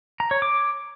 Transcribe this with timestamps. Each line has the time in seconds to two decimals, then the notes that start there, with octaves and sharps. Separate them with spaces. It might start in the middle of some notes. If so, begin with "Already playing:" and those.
0.20 A#5
0.31 C#5
0.42 D6